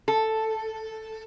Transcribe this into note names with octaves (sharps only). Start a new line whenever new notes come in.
A4